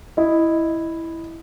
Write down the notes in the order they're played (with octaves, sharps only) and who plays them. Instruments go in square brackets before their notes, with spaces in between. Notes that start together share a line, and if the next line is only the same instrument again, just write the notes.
[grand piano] E4 D#5